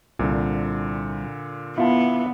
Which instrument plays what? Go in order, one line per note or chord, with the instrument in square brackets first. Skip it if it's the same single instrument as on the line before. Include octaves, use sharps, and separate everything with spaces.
[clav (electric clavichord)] C2 [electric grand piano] A#2 D3
[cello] B3 [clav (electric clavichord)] E4 F4 A5